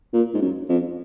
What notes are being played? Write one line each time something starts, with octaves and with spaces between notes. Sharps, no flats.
A#2
G#2
F#2
F2